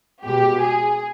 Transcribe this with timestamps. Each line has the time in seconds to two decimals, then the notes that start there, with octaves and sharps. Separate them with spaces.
0.25 B2 G#3 G4
0.61 G#4